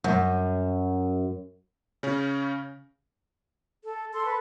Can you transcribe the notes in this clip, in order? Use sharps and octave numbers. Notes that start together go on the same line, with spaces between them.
F#2
C#3 C#4
A4
A4 C6
B4